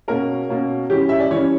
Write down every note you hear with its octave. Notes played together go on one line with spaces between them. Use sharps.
B2 A#3 C#4 A#4
B2 A#3 C#4
E3 G3 C#4 G4
E5
D5
E3 G3 C#4 C#5